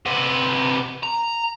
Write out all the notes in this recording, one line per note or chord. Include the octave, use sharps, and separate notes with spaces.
C3 B3
A#5